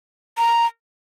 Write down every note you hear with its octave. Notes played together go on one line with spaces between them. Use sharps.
A#5